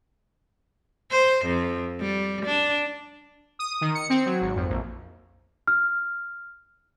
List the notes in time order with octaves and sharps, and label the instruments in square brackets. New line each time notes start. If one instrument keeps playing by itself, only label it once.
[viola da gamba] C5
F2
G3
D4
[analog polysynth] D#6
D#3
C#7
C4
F#3
G#1
F2
A#1
[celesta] F6